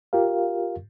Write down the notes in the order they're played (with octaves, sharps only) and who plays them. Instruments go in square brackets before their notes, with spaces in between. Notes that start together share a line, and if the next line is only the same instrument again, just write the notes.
[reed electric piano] F4 G4 A#4 F5